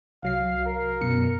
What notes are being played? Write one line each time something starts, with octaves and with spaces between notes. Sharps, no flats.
C2 F#3 F5 C7
A#4
F#2 B2 C#7